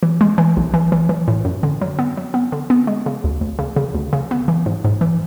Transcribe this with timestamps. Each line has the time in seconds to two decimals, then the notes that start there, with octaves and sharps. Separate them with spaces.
0.03 E3
0.21 G#3
0.38 E3
0.57 B1
0.74 E3
0.92 E3
1.09 E3
1.28 A2
1.45 F#2
1.63 D3
1.81 F#3
1.99 B3
2.17 F#3
2.34 B3
2.52 D3
2.70 B3
2.87 G#3
3.06 C#3
3.24 D2
3.41 D2
3.59 C#3
3.76 C#3
3.94 D2
4.13 C#3
4.31 B3
4.48 E3
4.66 G#2
4.84 G#2
5.01 E3